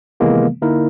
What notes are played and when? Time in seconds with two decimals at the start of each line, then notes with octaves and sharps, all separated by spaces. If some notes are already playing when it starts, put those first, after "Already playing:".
0.20 C3 D#3 E3 G#3 A#3 B3
0.62 D3 A#3 D#4 E4 A#4